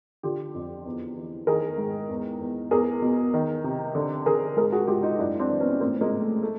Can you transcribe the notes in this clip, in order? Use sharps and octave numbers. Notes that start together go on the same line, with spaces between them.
D3 F4 G4
F2
E2
E3
D#3 G#4 A#4
G#2
E2
E2
E2 G#4 A#4
B2
D#3
C3
D3
D3 G#4 A#4
G#2 G#4 A#4
F#4 G#4
G#2 F4 G4
D#4 F4
F#2 D4 E4
C4 D4
E3
B3 C#4
A2 A#3 C4
G#3 A#3
A2
A3
A3